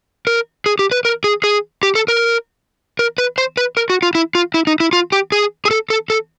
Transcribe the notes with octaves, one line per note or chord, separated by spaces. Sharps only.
A#4
G#4
G4
B4
A#4
G#4
G#4
G4
A4
A#4
A#4
B4
C5
B4
A#4
F#4
F4
E4
F4
E4
D#4
E4
F4
G4
G#4
G#4
A4
A4
A4